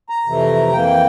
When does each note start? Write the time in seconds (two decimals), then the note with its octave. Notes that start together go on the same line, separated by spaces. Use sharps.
0.09 A#5
0.25 F2 C3 E3 A3
0.73 F2 E3 A#3 G5